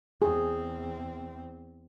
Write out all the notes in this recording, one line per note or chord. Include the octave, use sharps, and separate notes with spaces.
E2 C4 G#4